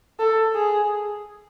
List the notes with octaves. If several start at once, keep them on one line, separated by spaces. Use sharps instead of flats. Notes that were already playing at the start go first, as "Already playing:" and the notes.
A4
G#4